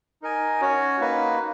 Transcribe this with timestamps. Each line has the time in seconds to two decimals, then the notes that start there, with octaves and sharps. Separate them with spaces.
0.22 D#4 A#4 D#5 G#5
0.61 C#4 F#4 C#5
1.00 A#3 D#4 F#4 B4